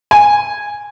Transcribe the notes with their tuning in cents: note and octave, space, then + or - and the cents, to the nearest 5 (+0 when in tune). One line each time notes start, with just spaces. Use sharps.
G#5 -10